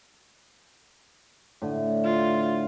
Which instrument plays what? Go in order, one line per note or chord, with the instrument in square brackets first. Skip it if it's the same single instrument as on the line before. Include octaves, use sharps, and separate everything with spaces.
[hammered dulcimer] A2 D3
[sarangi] F4